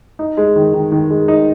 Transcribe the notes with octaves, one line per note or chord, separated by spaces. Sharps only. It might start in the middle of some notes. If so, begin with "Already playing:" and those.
D#4
G#3
D#3
D#3
D#3
G#3
D#4